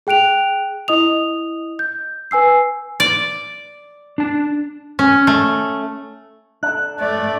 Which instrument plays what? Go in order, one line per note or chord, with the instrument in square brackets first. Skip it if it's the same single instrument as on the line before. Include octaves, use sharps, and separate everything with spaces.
[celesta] G#4 G5 F#6 D7 F7
E4 D#5 D#6 F7
G6
B4 G#5 E6 C7
[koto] D5
[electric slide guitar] D4 A5
[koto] C#4
A3
[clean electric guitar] D4 A4 [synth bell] F#6
[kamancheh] A3 [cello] D5